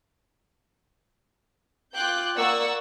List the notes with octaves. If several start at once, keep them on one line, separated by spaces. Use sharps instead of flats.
F4 F5 G5 D6 F#6 G6
A#3 D5 F#5 C#6 E6